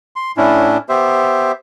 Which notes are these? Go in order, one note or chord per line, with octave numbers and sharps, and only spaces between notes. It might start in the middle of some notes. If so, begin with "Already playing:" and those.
C6
A2 C#4 D4 E4
B3 G4 C5 E5